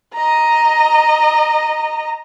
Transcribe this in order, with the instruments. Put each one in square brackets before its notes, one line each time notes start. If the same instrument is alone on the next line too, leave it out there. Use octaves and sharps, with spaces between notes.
[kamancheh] D#5 A#5